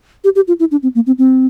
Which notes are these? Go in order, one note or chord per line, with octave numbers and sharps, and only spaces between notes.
G4
G4
F4
E4
D4
C4
A#3
C4
C4